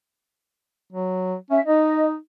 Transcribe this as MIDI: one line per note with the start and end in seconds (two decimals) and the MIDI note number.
0.93 1.35 54
1.50 1.59 61
1.50 1.60 76
1.65 2.16 63
1.65 2.04 75